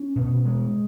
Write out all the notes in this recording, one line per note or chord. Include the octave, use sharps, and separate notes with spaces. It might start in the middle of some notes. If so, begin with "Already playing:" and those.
Already playing: C#4
B2
G#3